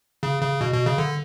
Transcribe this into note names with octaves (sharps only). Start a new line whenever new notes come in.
C#3
C#3
B2
B2
C#3
D3